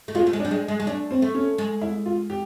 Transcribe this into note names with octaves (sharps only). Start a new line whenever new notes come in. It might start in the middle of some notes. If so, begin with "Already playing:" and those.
A3
G#3 F4
A3
G#3
D4
G3
G#3
G#3
G#3
A3 D4
C4
A3
C#4
G#3
E4
F4
G4